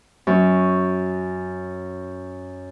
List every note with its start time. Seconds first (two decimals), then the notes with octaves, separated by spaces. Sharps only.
0.27 F#2 F#3 C#4